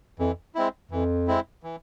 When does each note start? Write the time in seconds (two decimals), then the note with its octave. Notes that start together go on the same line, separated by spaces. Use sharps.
0.19 F2 E3
0.55 G#3 C4 E4
0.91 F2 E3
1.27 G#3 C4 E4
1.63 E3